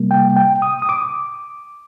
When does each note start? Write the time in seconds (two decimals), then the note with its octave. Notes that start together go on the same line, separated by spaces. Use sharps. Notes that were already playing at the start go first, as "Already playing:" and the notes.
Already playing: C3 G3 A#3
0.11 G5
0.36 G5
0.62 D#6
0.82 D#6
0.89 D6